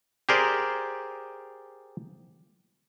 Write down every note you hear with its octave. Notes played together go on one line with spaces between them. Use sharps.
G4 G#4 A#4 C5 D5